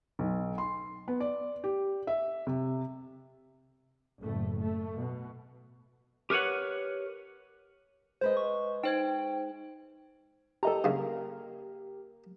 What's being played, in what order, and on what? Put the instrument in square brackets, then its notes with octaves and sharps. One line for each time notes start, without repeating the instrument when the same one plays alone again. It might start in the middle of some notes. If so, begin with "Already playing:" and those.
[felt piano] B1
C6
B3
D5
G4
E5
C3
[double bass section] F#1 A2 A3
A3
B2
[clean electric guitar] G4 A#4 B4 C#5 F#5
[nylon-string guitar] G#3 B4 D#5 [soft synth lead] C5
[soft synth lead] C#6
[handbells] D#4 C5 G#6 [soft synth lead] G5
[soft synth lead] G4 [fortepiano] A4 D#5 A#5
[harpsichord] G2 C#3 [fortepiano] A#3 A#4